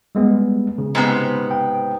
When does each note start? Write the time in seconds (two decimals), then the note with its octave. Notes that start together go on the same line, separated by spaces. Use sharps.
0.15 G3 G#3 B3
0.78 C#3
0.95 G#2 C3 B3
1.51 G5